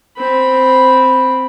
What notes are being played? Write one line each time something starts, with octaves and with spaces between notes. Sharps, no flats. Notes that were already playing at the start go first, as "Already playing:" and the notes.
C4 B5